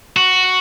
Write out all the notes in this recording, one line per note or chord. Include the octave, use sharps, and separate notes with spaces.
F#4